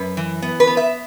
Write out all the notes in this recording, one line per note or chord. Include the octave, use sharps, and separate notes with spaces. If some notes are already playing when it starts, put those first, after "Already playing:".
Already playing: F#2 B4
E3
B3
B4
B3
E5